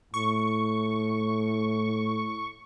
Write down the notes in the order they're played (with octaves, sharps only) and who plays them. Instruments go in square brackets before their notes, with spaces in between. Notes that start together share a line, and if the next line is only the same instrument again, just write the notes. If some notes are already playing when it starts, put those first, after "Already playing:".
[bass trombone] A2 [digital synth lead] C#6